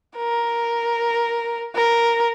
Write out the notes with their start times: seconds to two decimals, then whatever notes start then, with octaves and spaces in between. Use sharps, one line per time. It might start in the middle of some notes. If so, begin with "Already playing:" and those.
0.17 A#4
1.76 A#4